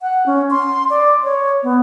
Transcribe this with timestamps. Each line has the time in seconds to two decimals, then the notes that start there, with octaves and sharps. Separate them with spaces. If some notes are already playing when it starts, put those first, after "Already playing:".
0.01 F#5
0.26 C#4
0.51 C6
0.90 D5
1.24 C#5
1.63 B3